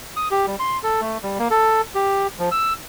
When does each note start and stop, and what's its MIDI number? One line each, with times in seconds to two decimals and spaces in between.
0.16 0.28 87
0.31 0.46 67
0.47 0.56 55
0.59 0.77 84
0.83 1.01 69
1.01 1.18 57
1.23 1.38 55
1.39 1.48 58
1.51 1.81 69
1.95 2.27 67
2.39 2.49 53
2.52 2.73 88